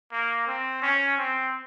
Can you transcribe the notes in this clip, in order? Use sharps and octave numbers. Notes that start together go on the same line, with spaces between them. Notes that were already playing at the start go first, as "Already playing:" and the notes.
A#3
C4
C#4
C4